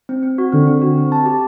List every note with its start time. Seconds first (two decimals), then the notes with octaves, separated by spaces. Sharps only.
0.09 C4
0.23 C4
0.38 F#4
0.52 D3 C4
0.67 C4
0.82 F#4
0.97 C4
1.12 A5
1.26 G4